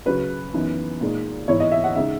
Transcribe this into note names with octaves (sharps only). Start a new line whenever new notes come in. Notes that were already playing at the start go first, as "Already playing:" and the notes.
C#3 F#3 C#4 B4
F#2 E3 B3 D#4
A#2 G#3 D#4
G#2 E3 B3 E4 C#5
D#5
E5
F#5
C#3 G#3 D#4 E5